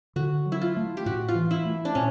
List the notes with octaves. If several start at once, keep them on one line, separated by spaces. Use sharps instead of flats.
D3 F#4
F#3
E4
F4
A3
G4
A2 F#4
F4
E3
E4
A3
D4
A#2 C#4